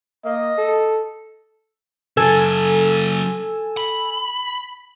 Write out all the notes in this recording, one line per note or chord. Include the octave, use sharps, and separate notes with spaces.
A#3 D#5
A4
C#3 F#3 A4 G#5 E6
B5